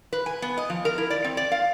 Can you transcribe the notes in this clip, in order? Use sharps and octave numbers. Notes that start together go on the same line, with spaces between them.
B4
G#5
B3
D#5
F3
A#4
E4
D5
C4
D5
F5